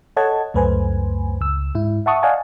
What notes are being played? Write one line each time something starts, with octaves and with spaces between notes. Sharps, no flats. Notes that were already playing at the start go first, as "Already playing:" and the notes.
A4 C#5 D#5 F#5 A5 G#6
C#2 F#2 A3 B4 C5 G#5
C#2 E6
G#2 E4
E5 F#5 A5 C#6 D#6
D5 D#5 F5 F#5 G#5 A5